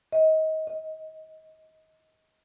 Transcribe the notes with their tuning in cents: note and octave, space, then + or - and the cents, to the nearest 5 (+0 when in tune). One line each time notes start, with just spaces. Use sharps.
D#5 +25
D#5 +5